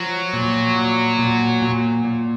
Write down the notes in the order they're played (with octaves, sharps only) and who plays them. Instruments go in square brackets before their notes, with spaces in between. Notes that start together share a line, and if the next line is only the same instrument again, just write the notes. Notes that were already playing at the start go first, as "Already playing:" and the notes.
Already playing: [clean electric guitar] F3 [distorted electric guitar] F#3
[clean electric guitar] A#2
A#2
A#2
A#2
A#2